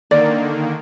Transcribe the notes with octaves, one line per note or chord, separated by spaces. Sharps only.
D3 D#3 A#3 D5